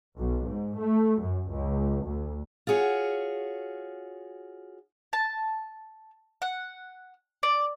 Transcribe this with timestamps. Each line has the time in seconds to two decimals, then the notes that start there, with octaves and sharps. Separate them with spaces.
0.17 B1
0.47 G#2
0.78 A3
1.21 F#2
1.52 C#2
2.06 D2
2.67 F4 F#4 G#4 C#5
5.13 A5
6.42 F#5
7.43 D5